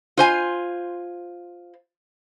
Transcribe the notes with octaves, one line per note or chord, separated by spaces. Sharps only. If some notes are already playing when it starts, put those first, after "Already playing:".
F4 C5 G#5